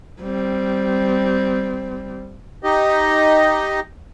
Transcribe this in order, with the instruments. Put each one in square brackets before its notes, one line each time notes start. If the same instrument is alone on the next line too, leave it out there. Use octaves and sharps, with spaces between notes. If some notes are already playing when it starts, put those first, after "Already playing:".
[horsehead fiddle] G3 C4
[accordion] D#4 G4 D#5